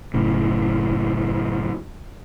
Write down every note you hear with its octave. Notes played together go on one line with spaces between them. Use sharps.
F#1 A2 C#3